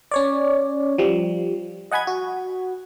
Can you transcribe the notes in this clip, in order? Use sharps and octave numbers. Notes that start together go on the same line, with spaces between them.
C#4 C#5 D5
F3 G3
D#5 F#5 G#5 B5 G#6
F#4